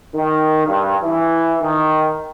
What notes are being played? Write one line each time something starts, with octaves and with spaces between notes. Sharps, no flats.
D#3
G2
E3
D#3